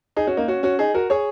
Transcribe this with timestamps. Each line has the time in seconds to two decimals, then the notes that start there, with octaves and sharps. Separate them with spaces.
0.16 D#4 G#4
0.27 C#4 F#4
0.37 A#3 D#4
0.48 C#4 F#4
0.63 C#4 F#4
0.79 D#4 G#4
0.94 F#4 A#4
1.10 G#4 C#5